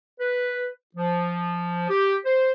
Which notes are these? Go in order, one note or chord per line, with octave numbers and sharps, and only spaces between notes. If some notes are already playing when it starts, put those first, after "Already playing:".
B4
F3
G4
C5